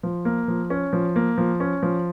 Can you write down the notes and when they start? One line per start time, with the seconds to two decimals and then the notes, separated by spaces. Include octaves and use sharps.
0.03 F3
0.25 A#3
0.48 F3
0.70 C#4
0.93 F3
1.16 A#3
1.38 F3
1.60 C#4
1.83 F3